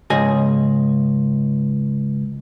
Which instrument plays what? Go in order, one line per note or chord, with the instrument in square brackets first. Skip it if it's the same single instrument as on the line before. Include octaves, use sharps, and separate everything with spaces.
[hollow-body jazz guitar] C#2 G#2 G#4 D#5 G#5